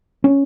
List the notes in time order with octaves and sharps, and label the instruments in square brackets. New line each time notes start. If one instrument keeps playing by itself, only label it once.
[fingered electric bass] C#4